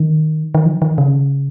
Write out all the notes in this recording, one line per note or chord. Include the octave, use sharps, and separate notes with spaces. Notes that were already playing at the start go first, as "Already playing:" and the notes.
Already playing: D#3
D#3
F3
D#3
C#3